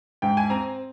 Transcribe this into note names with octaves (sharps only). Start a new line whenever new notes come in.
G#2 G5
G#5
C4 A#5